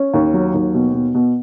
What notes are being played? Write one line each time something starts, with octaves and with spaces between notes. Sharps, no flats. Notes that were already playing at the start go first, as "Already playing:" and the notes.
Already playing: C#4
D#2
F#3
D#2
B2
B2
B2